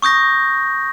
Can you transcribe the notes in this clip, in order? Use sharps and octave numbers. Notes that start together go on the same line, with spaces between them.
C#6 D#6 G6 A#6